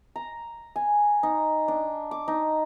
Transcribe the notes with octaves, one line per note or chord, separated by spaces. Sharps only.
A#5
G#5
D#4
D4
D6
D#4